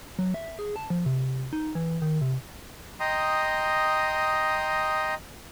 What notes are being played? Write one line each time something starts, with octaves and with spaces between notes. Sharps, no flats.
F#3
E5
G#4
A5
F3
C3
D#4
E3
D#3
C3
D#5 G5 A#5 C6 D#6